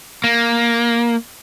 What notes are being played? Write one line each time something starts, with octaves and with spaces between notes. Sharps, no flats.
A#3